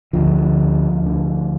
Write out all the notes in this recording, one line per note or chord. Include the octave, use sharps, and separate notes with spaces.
D2 D3 F3
D2 D3